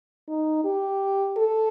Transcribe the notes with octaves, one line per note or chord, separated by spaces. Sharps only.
D#4
G4
A4